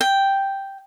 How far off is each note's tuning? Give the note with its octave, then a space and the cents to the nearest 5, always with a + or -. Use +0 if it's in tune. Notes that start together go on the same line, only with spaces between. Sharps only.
G5 +0